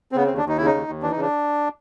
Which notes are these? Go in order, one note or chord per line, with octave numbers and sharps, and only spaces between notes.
C4
C#3 B3
C4
D#2
D4
D#2 D#4
C#3 E4
D#4
D#2
D#2
E3 D4
D#4
C#3 D4